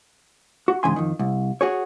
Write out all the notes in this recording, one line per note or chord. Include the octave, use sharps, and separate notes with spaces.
F#4
G#2 C#3 E3 G#5 C6
F2 D#3
C2
F#4 G#4 C#5